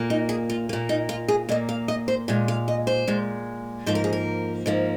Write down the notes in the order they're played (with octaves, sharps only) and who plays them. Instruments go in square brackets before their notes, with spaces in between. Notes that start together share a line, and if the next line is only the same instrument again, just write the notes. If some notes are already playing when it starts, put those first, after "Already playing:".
Already playing: [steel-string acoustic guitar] A#2 A#3
D#4
G#4
F4
A#2 A#3
D#4
F4
G#4
A#2 A#3 D#5
F5
D#5
C5
A#2 G#3 F5
F5
D#5
C5
A#2 G#3
G#2 F3 A#3 C5
A#4
G#4
A#4
G#2 F3 A#3